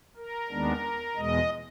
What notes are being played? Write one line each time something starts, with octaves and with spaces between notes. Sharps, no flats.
A#4
D#2 D#3 G#3 B3 D4
E2 B2 G#3 D#5